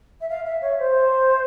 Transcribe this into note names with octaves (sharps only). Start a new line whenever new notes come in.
E5
F5
E5
C#5
C5